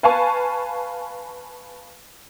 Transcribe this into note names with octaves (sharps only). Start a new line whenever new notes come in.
B4 F5 G#5 A5 C#6